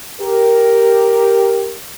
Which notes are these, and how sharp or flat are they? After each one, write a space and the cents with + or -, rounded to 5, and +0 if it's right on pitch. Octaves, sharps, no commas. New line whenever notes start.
G4 +0 A#4 +0